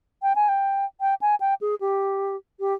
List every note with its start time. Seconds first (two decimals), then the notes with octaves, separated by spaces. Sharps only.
0.22 G5
0.35 G#5
0.49 G5
1.01 G5
1.21 G#5
1.40 G5
1.61 G#4
1.80 G4
2.60 G4